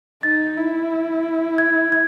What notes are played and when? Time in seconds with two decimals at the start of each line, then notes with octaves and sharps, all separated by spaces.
0.23 D#4 A6
0.57 E4
1.58 G#6
1.92 G#6